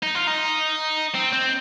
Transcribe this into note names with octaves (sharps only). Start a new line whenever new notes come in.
D#4
F4
D#4
C4
C4